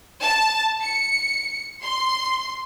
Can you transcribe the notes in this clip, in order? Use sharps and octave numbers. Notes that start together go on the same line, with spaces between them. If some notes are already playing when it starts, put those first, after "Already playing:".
A5
C#7
C6